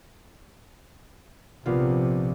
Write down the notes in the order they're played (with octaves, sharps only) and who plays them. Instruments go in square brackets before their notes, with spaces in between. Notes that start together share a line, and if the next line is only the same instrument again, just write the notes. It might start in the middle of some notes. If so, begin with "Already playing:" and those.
[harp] A#1 F5 [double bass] C3 [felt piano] F3 B3 F4